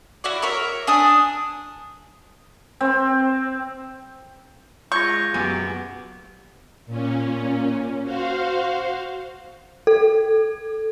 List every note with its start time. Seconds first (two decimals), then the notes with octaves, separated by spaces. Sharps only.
0.24 E4 F#4 D5
0.42 A#4 C#5 E5
0.87 D4 G#5 D#6
2.81 C4
4.92 G#3 F4 C#6 G6 G#6 A#6
5.34 F#2 B3 G4 G#5
6.86 A#2 C#4
8.04 F#4 C5 F5
9.87 A4